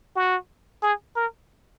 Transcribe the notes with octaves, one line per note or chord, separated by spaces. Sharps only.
F#4
G#4
A#4